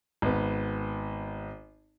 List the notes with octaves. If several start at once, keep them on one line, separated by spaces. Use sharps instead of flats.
G#1 B3